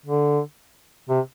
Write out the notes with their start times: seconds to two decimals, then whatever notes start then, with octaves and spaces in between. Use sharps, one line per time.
0.06 D3
1.09 C3